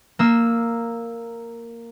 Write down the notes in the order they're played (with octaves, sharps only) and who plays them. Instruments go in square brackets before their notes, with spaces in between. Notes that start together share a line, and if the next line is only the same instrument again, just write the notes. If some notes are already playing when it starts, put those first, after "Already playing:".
[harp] A#3 E6